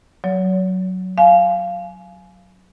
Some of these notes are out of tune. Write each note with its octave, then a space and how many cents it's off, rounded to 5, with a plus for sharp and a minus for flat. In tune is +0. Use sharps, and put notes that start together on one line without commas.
F#3 +0 C#5 +40
F5 -10 G#5 +25